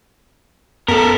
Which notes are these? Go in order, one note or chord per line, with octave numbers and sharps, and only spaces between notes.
F#2 B3 A4 A#4 B6